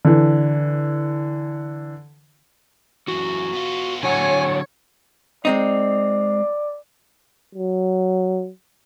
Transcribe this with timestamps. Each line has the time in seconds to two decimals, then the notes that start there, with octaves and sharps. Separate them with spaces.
0.05 D3 E3
3.08 F#2 E3 F#4
3.53 B3 F4
4.03 D3 F#3 C#5 F#5 G#5
5.45 G#3 C4 D#4 D5
7.55 F#3